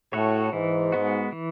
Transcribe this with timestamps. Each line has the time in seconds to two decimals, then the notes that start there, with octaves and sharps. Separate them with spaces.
0.13 A2 F#4 A4 C#5
0.53 G#2 E3
0.92 G#3 B3 F#4
1.32 E3